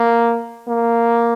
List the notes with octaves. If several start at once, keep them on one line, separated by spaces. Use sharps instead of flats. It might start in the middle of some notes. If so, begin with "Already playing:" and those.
Already playing: A#3
A#3